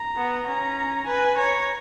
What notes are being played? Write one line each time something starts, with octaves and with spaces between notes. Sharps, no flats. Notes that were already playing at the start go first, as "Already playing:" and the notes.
Already playing: A#5
B3
C#4 A#5
B4 G#5
C#5 A#5